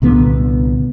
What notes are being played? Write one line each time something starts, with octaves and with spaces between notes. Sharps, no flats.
C2 A#2 D3 B3